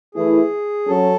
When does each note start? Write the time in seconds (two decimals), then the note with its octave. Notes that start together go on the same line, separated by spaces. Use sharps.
0.15 E3 A3 E4 G#4
0.88 F#3 C#4 A4